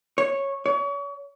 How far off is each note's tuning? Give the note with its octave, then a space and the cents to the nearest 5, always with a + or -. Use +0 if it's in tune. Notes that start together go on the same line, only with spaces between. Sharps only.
C#5 -10
C#5 +35